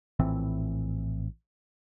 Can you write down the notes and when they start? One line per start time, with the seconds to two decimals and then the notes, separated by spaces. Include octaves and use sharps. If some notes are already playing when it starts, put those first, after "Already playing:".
0.19 A#1 A2 E3 C4